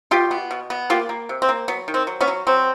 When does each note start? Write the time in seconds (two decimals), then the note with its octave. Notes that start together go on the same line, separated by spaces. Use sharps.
0.11 B2 F4 G4
0.31 B3
0.51 B2
0.70 B3
0.90 A#3 F4 G4
1.09 A#3
1.29 C3
1.42 C4
1.49 A#3
1.68 F#3 B3
1.88 D#3
1.94 C4
2.07 F#3
2.21 B3 C#4
2.28 F#3
2.47 F#3 C4